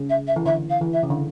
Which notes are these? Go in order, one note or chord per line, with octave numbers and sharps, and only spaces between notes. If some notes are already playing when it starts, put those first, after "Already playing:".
Already playing: C#3
E5
E5
E3
D3 E5
F5
E3
E5
C#3
D3